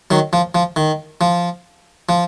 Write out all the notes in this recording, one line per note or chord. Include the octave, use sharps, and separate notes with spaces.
D#3 F#3
F3
F3
D#3
F3
F3